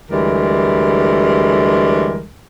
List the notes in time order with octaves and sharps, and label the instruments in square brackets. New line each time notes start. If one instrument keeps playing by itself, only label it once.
[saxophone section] D2 E3 G3 G#3 A#4